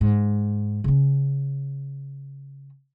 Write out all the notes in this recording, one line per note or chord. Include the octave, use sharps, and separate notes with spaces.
G#2
C#3 C#4